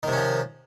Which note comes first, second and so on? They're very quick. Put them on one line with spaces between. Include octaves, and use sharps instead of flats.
D#3 C3 C#4 F3